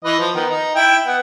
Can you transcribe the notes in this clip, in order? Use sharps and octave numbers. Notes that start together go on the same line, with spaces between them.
E3 B4 D#5
F3
D#3 B3
D#4
E4 E5 G5
B3 F#5